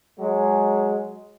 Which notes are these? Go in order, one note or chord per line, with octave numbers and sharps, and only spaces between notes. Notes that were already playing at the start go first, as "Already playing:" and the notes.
F#3 G#3